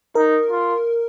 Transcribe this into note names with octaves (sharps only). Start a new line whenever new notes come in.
D#4 A#4
F4